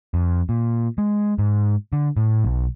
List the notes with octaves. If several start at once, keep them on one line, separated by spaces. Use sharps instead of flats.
F2
A#2
G#3
G#2
D3
A2
B1